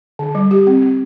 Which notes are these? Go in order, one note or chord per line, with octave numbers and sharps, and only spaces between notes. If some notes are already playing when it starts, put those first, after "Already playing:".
D3
G3
G4
C4
C4